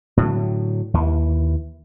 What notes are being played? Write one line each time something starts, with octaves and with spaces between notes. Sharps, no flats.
A2 D3 F#3
D#2 E3